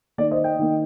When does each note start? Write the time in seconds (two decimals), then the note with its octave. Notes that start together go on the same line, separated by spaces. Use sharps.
0.18 D#3 A#3 D5
0.31 C5 D#5
0.44 D#5 G5
0.59 D#3 A#3